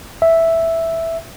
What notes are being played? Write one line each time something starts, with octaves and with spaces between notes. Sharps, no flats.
E5